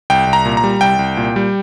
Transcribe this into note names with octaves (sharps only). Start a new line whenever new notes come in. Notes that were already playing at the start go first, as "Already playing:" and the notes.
C2 G5
C2
A#5
A#2
A#5
G3
C2 G5
C2
A#2
G3